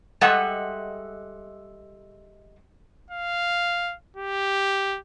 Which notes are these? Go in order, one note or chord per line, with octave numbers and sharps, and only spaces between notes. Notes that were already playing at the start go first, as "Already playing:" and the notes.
G3 G#3 A4 D#5 E5 F#5
F5
G4